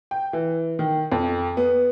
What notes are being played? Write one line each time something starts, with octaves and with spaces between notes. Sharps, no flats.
G5
E3
D#3
F2
B3